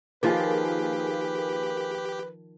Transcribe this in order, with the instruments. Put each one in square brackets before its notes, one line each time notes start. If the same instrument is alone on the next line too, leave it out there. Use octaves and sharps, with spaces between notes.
[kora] D#3 F3 [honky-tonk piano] A#3 F4 G#4 [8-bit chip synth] G4 [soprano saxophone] B4